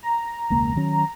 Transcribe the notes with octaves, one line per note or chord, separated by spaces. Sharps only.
A#5
E1 C#2 A#3
D#3 F#3 C#4